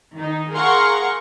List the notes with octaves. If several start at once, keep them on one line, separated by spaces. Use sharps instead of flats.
D#3 D#4
G#4 A#4 F5 F#5 C6 C#6